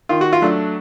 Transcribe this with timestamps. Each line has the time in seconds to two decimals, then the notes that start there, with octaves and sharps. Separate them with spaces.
0.09 D#3 F4
0.21 F#4
0.33 F4
0.42 F#3 A3 D4